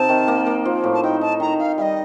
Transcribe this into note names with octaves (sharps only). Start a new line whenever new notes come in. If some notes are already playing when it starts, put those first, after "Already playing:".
Already playing: C3 D#4 A5
D#3
A#3
A#3
F3
A2
A5
D#4 G5
D#4 A5
D#3 A#5
D#4 F5
G3 D#5 F5